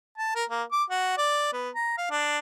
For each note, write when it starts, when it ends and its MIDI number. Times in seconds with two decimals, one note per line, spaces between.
0.18 0.32 81
0.35 0.44 70
0.49 0.63 58
0.72 0.83 86
0.90 1.14 66
1.17 1.48 74
1.53 1.69 59
1.74 1.96 82
1.97 2.06 77
2.10 2.38 62